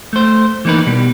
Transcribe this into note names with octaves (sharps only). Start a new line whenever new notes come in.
A3 C5
E3 A#3 D#4 A#4 B4
B2 G3